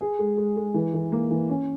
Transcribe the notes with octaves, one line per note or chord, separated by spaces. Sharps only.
G#4
G#3
G#3
G#3
E3
E3
A#3
E3
C#4